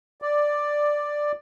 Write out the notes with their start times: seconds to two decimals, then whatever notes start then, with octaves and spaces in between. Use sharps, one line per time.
0.22 D5